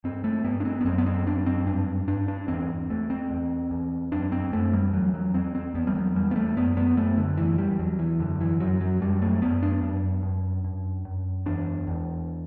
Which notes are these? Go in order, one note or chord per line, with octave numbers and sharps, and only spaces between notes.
G2 C4
A3
G2 B3
D4
C4
B3
F#2 C4
B3
C4
F#2 D4
C4
G2 D4
G2 D4
D4
E2 C4
E2 A3
C4
E2
E2
F#2 D4
C4
F#2 A3
G3
E2 F#3
F#3
E2 C4
C4
E2 B3
G3
F#3
E2 G3
B3
A3
F#2 B3
B3
F#2 A3
D3
E2 E3
G3
E2 F#3
E3
F#2 D3
E3
F#2 F#3
F#3
F#2 G3
A3
F#2 B3
D4
F#2
F#2
F#2
F#2
E2 D4
E2